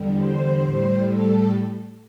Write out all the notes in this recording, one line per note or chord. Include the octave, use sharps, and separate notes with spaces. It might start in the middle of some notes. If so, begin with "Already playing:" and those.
Already playing: E2 D3 G3
C5
A2 G3
A4